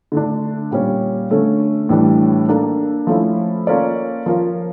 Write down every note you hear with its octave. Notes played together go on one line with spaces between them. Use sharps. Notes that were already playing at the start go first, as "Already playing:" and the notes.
D3 A3 D4
A#2 G3 C#4
D3 A3 C#4
A2 E3 G3 D4
A#3 D4 A4
F3 A3 C#4 E4
A#3 C#4 F4 A4 D5
F3 C#4 F4 A#4